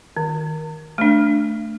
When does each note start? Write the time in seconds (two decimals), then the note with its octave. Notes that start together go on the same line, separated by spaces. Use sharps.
0.17 D#3
0.98 A3 D4